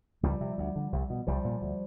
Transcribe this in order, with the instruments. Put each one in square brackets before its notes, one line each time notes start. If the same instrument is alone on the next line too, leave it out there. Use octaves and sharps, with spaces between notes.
[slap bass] C#2 F3 G3
C3
D2
D3
C2
B2
C2 F3 G3
A#2
D2